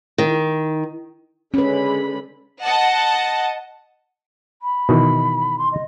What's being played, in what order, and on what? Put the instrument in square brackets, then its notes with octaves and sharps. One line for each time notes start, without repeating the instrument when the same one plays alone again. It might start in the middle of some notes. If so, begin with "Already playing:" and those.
[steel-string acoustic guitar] D#3
[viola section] D3 G#3 B5 [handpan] C#4 B4
[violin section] D#5 F#5 A5
[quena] B5
[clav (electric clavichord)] B2 D#3 E3
[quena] C6
D#5